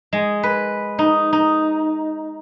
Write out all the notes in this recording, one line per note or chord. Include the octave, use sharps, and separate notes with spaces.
G#3
B4
D#4
D#4